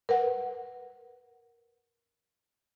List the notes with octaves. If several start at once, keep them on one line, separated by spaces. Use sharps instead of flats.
A#4 B4 F#5